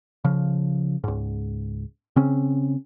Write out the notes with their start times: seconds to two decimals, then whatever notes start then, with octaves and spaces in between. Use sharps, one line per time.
0.24 C#3 F3
1.04 C#2 G#2
2.16 C#3 C4 C#4